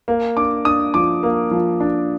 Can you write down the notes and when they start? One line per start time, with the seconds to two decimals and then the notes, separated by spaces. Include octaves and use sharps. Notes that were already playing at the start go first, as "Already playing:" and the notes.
0.08 A#3
0.37 D4 D6
0.65 D4 D#6
0.94 F3 D6
1.23 A#3
1.51 F3
1.80 D4